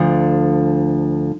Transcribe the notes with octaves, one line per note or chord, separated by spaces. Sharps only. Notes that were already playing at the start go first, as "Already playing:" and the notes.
Already playing: D2 D3 F3